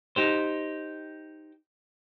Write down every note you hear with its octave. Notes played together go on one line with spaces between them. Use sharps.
D#4 G4 C5